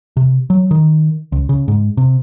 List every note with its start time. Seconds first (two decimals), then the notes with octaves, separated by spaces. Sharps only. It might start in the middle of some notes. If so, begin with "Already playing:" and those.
0.17 C3
0.50 F#3
0.71 D#3
1.32 C#2
1.49 C#3
1.68 G#2
1.97 C3